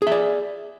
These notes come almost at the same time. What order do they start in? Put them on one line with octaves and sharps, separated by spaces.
G#4 E5 D5